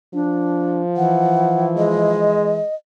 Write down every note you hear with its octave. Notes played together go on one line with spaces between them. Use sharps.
F3 D4
E3 F#5
G#3 D#5